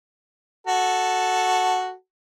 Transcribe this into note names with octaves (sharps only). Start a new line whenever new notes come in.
F#4 A4